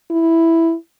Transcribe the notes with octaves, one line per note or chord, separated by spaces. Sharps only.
E4